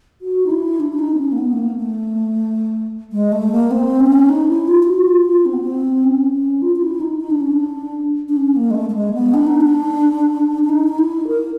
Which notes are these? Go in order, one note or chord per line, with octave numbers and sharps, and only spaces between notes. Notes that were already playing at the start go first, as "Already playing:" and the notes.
F#4
D#4
E4
D4
D4
D#4
C4
C#4
A#3
B3
A3
A#3
A3
G#3
A3
A#3
C4
C#4
D#4
E4
F4
F4
F#4
F4
F4
C4
B3
C4
C#4
C#4
F4
F4
E4
D#4
D#4
D4
C#4
D4
D4
C#4
A#3
G#3
A3
A3
G#3
B3
D4
D#4
D4
D4
D#4
D#4
E4
A#4